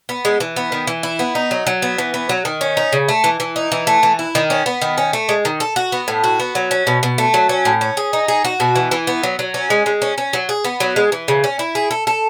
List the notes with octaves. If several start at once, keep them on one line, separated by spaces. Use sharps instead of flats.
B3
G#3
E3
B3
D#3
E3
E4
B3
D#4
F#3
F#3
B3
E3
B3
F#3
D#3
C#4
D#4
C#3
A3
E3
E3
D#4
E3
A3
E3
E4
D#3
C#4
B3
D#3
C#4
A3
G#3
D#3
A4
F#4
B3
A2
F#4
B3
F#3
C#4
B2
B2
A3
F#3
C#4
A2
C#4
G#4
D#4
G#4
F#4
B2
E3
E3
B3
F#3
F#3
C#4
G#3
G#3
C#4
C#4
F#3
G#4
B3
F#3
G#3
E3
C#3
C#4
E4
G#4
A4
A4